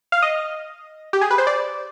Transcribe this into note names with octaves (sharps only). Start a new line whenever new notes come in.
F5
D#5
G4
G#4
B4
C5
D5